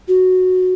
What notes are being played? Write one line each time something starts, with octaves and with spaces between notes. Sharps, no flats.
F#4